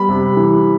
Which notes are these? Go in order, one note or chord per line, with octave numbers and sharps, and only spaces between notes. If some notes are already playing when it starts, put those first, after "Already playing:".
Already playing: G3 B3 B5
C3
E3